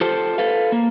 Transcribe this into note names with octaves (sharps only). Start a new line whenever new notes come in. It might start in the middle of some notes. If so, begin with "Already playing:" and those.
F4 G4 A4 C5
A4 B4 F5
A#3